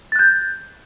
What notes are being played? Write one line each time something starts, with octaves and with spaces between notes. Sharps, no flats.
F#6 G6 A6